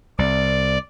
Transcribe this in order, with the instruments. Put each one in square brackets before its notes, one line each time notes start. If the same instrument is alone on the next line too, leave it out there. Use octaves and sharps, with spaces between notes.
[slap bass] C2 [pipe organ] D5